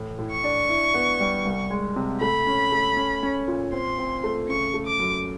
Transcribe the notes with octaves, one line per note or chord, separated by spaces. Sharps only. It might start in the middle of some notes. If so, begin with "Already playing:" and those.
Already playing: A2 E3
A2
C#6
D4
E4
B3
G3
C2
G#3
C3
A3 B5
C#4
A3
C#4
C#4
A#2
C4 C6
C4
A3
C#3 C#6
A3
D6
F#2